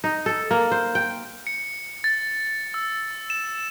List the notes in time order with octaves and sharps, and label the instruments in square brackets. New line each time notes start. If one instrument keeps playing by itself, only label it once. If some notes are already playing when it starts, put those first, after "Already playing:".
[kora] D#4
A4
A#3
C5
G5
[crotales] C#7
A6
E6
E7